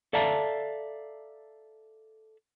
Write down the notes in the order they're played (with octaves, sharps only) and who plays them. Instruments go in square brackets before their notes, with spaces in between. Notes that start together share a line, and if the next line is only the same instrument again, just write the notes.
[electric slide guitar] A4 D5 E5 F5 A5 A#5